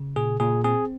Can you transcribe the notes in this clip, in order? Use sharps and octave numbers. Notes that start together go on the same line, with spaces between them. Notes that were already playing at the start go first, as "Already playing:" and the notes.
Already playing: C#3
A#2 G#4
A#2 G#4
C4 G#4